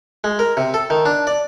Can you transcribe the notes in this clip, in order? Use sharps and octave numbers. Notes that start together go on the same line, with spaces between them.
G#3
A#4
C3
A4
D#3
D4
D5